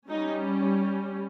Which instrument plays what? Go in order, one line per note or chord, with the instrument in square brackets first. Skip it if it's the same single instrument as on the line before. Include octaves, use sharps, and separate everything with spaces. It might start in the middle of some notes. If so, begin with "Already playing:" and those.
[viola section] G3 C#4 D#4